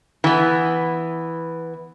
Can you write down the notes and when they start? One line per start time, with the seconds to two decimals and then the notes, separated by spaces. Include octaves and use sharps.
0.24 E3 B3